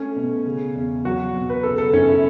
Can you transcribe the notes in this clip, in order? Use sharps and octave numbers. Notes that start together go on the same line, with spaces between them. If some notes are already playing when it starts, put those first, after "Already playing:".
Already playing: A3 C#4
B2
C#3
E2
F#3 F#4
B2
B4
C#3 A4
A4
F#2 C#4
E4